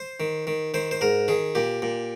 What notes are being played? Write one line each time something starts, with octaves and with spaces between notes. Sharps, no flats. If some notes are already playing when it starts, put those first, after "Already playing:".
Already playing: C5
D#3
D#3
D#3 C5
C5
G#2 A#4
D#3 G#4
A#2 G4
A#2